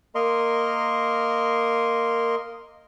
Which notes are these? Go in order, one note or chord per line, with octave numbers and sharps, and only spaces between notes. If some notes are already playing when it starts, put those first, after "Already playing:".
A#3 A#4 D#5 C6